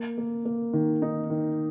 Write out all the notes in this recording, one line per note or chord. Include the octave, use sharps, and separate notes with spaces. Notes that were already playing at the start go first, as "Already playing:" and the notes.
Already playing: A#3
A#3
A#3
D#3
D#4
D#3